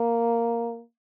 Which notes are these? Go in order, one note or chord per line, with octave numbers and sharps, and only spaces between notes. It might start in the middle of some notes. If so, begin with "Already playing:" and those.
Already playing: A#3